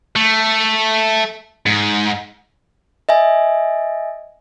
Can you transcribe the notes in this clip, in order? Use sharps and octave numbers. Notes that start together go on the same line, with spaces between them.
A3
G#2
D#5 E5 G#5